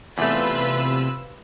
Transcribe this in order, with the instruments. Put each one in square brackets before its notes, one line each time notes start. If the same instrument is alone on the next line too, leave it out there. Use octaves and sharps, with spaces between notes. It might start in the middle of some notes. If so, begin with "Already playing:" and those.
[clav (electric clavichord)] E2 A3 [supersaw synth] C3 E6 [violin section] F4 B4 B5